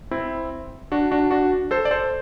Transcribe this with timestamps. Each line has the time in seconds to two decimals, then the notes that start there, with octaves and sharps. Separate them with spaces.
0.11 C4 E4
0.92 D4 F#4
1.12 D4 F#4
1.31 D4 F#4
1.71 A4 C5
1.85 D5
1.91 A4 C5